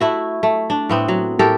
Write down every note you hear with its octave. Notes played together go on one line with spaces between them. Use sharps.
A3 E4 F#4
A3
D4
A2 B3 C4
F#3
A2 G4 A4 A#4